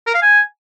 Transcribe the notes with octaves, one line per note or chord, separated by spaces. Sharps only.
A#4
F5
G#5